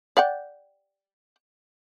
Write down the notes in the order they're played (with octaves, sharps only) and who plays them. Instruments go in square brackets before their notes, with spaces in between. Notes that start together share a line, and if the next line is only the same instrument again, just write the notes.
[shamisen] D5 F#5 G5